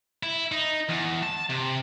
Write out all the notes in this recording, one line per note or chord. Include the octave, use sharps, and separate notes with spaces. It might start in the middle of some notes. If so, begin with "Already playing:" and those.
E4
D#4
E2
A5
C3